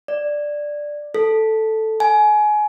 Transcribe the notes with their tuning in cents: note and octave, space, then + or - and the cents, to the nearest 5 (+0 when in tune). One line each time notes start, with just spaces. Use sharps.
D5 +5
A4 +0
G#5 +25